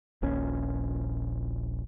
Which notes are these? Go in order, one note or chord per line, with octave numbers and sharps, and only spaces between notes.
D#1 A#1 C#4